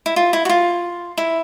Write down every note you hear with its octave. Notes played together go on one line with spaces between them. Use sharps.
E4
F4
E4
F#4
F4
E4